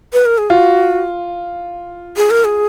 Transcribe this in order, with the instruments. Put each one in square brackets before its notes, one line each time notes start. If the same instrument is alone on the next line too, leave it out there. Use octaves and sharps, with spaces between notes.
[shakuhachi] B4
A#4
G#4
[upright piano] F4 [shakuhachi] F#4
[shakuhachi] G#4
A#4
G#4